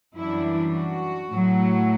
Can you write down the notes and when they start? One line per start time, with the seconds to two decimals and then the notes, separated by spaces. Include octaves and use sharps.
0.15 F#2 E3 G3 D4 E4
0.72 F#4
1.30 A2 F#3 A3